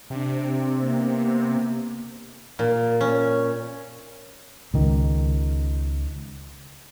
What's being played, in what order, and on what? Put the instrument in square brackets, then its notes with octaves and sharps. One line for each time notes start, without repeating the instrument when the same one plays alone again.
[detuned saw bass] C3 [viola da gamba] D4
[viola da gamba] A#3 B3
[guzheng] A#2
C#4
[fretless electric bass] C#2 D#3